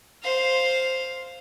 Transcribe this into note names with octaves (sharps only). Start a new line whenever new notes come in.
C5 F5